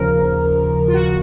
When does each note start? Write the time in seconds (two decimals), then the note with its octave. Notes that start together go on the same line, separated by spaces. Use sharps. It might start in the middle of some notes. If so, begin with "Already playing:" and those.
Already playing: D#2 C#3 F3 A#4
0.88 F4
0.94 F#4